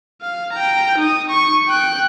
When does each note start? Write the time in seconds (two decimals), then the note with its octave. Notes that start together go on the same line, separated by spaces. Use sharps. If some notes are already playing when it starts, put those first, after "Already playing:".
0.22 F5
0.53 G5 A#5
0.98 D#4 D#6
1.30 C#6
1.68 G5 F#6